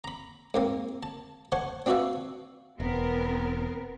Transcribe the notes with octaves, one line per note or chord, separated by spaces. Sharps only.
A#5 B5
G#2 A#3 C4
A5
C5 F#5 G#5 A5 C#6
C4 D4 F#4 B4 E5 F5
E1 B3 C4 A#4